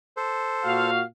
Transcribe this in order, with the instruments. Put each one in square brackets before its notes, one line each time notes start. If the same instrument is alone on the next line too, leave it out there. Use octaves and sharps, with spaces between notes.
[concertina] A4 C5
[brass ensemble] A#2 F#4 F5